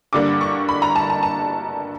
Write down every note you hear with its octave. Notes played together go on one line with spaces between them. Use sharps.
G2 D3 G3 A#3 D4 D6
C#6
B5
A#5
A5
A5
A5